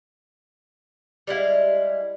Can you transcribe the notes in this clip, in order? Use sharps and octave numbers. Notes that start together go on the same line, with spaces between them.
G3 G#3 E4 F5